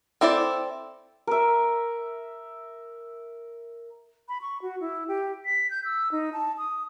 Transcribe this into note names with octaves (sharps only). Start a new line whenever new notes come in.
C4 E4 A4 C5 D5
A#4 E5
B5
C#6
F#4
E4
G4
B6
G6
E6
D#4
A5
D#6